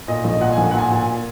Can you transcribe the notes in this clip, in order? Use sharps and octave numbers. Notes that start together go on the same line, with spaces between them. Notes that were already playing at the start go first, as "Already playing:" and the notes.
A#2 D#5
A#1 D#5
A#2 F#5
G#5
A#1
G#5
F#5
A#2 G#5
A#2